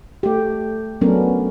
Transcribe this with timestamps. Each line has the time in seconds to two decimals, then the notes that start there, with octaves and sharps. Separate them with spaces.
0.23 A3 G4
1.01 F#3 A3 B3 C#4 D4 A#4